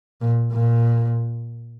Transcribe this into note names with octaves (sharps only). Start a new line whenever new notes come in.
A#2
A#2